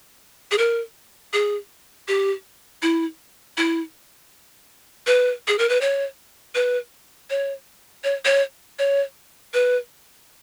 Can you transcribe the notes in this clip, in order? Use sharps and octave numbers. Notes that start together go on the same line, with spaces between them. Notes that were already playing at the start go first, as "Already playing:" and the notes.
G#4
A#4
G#4
G4
E4
E4
B4
G#4
A#4
B4
C#5
B4
C#5
C#5
C#5
C#5
B4